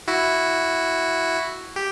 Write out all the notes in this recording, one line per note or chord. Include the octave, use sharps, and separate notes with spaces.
E4 F#4
G4